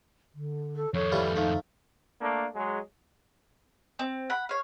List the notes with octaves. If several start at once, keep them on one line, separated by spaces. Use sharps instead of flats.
D3
A4
F2 D#3 A4 C#5
E3 G3 F4
F3 A3 D#4
A3 A#3 D4
F#3 G#3
C4
F#5 B5
C#5 F5